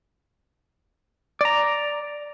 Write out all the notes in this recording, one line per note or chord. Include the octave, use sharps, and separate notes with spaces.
D5 A#5